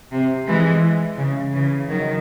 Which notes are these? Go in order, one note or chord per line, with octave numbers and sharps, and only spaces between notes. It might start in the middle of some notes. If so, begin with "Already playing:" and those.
C3
E3 G#3
C#3
C#3 E3
D#3 F#3